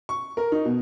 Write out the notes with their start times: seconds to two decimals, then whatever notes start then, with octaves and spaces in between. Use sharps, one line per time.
0.09 C#6
0.37 A#4
0.52 D#4
0.65 B2